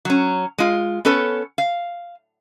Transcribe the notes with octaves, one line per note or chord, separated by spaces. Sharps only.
F#3 C#4
G#3 F4
B3 C#4 A4 B4 C#5
F5